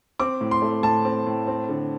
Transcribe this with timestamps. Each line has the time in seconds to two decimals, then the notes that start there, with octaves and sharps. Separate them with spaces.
0.20 C4 D6
0.41 A2
0.51 C6
0.62 A3
0.83 A2 A5
1.05 C4
1.26 A2
1.47 C4
1.69 D3